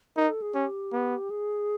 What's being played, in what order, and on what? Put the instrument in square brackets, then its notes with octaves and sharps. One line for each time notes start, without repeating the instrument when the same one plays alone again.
[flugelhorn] D#4 [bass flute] A#4
[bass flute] A4
G#4
[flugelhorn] C#4 [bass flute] G4
[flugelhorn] B3
[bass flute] G#4